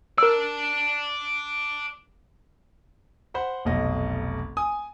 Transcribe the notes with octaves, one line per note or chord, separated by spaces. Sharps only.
A#4 D5 A5 E6
C5 F#5 B5
F1 B1 D#5
G#5 D#6